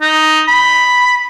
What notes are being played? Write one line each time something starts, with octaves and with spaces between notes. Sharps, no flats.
D#4
B5